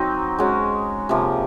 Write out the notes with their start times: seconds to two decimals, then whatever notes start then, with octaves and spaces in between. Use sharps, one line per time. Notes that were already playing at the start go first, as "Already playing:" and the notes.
Already playing: F#3 C4 D#4
0.39 G#3 C#4 F#4
1.09 C3 F3 A#3